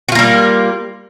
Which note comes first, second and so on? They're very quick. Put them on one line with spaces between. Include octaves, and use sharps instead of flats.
F#4 F4 A#3 G3